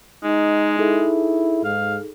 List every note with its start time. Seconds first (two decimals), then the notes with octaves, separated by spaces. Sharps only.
0.24 G#3 D#4
0.79 D#4 E4 G#4 A4
1.65 G#2 F5